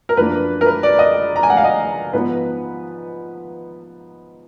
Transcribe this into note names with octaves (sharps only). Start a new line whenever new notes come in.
A#4
F#2 F3 A#3 D4 B4
A#4
B4
D5
D#5
A#5
G#5
F#5
F5
D#5
G#2 F3 B3 B4